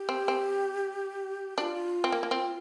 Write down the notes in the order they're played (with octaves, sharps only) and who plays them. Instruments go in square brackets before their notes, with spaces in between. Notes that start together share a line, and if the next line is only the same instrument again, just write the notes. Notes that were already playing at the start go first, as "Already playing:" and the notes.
Already playing: [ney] G4
[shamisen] C4
C4
[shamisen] D4 [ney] F4 G4
[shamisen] C4
A#3
A#3
C4